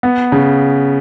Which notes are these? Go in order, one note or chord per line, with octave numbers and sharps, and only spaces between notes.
B3
C#3